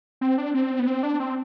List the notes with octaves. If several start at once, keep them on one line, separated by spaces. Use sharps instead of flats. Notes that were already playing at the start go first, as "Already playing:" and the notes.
C4
D4
C4
B3
C4
D4
C4